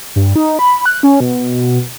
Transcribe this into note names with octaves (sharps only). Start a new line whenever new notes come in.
G2
D#4
B5
F#6
C#4
B2